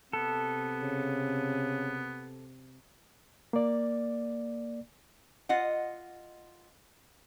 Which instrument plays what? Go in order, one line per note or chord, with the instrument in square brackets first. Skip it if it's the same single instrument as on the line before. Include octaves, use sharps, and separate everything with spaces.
[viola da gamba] C3 [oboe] B3 [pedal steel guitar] A4
[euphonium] C#3
[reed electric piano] A#3 D5
[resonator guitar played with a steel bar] F4 D#5 F#5